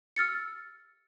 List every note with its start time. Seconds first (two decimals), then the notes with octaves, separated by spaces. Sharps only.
0.16 E6 F6 A6 C#7